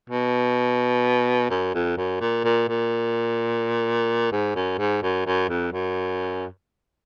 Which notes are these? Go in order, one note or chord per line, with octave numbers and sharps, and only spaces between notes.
B2
F#2
F2
F#2
A#2
A#2
A#2
G#2
F#2
G#2
F#2
F#2
F2
F#2